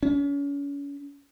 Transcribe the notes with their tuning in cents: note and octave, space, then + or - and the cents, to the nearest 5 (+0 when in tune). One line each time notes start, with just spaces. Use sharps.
C#4 +35